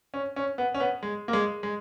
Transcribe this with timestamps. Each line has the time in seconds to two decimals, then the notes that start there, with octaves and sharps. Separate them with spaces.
0.14 C#4
0.36 C#4
0.58 B3
0.74 C#4
0.80 B3
1.03 G#3
1.28 A#3
1.33 G#3
1.63 G#3